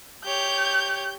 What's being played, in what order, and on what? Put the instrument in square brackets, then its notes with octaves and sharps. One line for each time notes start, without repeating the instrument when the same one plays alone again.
[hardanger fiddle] G4 C#5 [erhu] G6